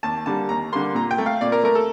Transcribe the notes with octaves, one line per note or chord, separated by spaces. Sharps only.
D#2 A5
D3 G3 A#3 A5
D#2 A#5
D3 G3 A#3 C6
A#2 A#5
G5
A3
F5
A#2 D5
A#4
A3 A#4
A4